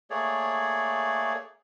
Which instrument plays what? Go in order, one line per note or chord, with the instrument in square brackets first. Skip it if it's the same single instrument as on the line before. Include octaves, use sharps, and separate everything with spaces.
[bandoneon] A3 A#3 G#4 C#5 D5